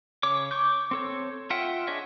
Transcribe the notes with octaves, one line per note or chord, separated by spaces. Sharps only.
C#3 C#5 D6
C#6 D6 G6
C4 A4 C#5
F4 E5 F#5 G5
D4 G#4 C#5 D#5 E5